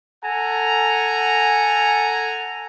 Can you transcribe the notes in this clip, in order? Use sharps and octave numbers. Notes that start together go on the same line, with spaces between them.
A4 F#5 G#5 A#5